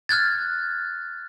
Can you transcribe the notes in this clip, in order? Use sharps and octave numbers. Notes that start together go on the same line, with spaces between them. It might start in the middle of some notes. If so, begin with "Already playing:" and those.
F6 F#6 G#6 A6